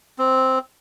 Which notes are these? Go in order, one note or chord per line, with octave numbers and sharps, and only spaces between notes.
C4